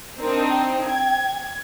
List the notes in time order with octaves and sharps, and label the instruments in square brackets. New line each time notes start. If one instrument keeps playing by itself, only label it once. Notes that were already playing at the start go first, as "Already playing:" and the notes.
[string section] C4 D4 D#4 [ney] A#4
[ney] G5
[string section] G#6